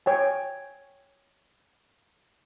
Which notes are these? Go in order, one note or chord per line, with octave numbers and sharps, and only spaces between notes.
C#5 G5 G#5